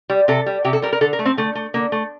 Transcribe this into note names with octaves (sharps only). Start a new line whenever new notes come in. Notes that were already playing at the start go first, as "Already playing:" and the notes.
G3
C3 A4
G3
C3 G4
A4
G3 A#4
A#4
D3 A4
A#4
A3
C4
D3 A3
A3
D3 A#3
A3